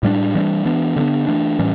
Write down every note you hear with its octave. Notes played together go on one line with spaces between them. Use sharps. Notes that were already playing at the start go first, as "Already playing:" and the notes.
A2 G3 B3 D4
E3 G3 B3 D4
E3 B3 D4
D3 F#3 B3 D4
E3 A3 D4
A2 E3 G3 C#4